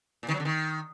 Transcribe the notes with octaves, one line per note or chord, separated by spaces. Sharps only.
A#2
D#3
F#3
D3
D#3